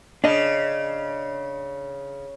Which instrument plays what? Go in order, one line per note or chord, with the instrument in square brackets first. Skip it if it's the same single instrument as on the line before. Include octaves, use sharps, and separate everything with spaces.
[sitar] C#3 [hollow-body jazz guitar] D4 D#5